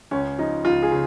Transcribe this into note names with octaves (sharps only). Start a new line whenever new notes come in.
C#2 C#4
F3 D#4
C#2 F4
G#4
C#3